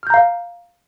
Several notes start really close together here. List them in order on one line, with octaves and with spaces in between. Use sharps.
F6 G6 A#5 F5